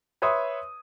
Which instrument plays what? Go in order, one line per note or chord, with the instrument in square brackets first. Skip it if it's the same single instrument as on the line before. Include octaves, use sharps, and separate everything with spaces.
[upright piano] B4 C#5 E5 C6 D#6